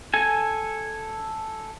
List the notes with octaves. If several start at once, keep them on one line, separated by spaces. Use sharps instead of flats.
A4 G#5